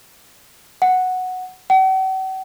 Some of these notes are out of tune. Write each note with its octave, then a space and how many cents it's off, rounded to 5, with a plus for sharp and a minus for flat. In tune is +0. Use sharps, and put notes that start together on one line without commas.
F#5 -5
F#5 +45